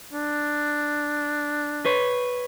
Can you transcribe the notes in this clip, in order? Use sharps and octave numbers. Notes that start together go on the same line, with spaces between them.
D4
B4 C#5